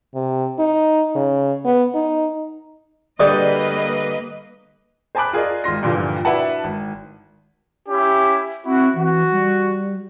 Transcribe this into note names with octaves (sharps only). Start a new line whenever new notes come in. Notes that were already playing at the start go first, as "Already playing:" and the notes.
C3
D#4
C#3
B3
D#4
D3 G3 A#3 G#4 B4 D5 D#5 D#6
C5 G#5 A5 B5 D6 F#6
F4 G#4 A#4 D5 D#5
G#1 F4 C6 A#6
G2 A#2 D3 E3 F3
D4 E4 F#4 B4 F#5 A5
G#1
C#4 E4 G4
C4 E4 F#4
E3 F#4
G3